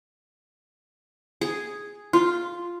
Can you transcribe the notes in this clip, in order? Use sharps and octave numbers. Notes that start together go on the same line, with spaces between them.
G#4
F4